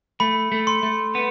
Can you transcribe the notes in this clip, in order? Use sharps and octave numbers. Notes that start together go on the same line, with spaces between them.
A3 B5
A3
C6
A3
B3